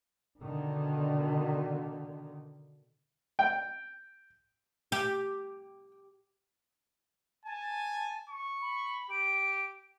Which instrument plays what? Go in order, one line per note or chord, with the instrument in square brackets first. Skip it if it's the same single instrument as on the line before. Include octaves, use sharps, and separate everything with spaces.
[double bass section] B2 D3 D#3
[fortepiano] G5
[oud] G4
[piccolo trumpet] G#5 [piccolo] A5
[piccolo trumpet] C#6
[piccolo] B5
[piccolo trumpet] G4 [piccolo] D7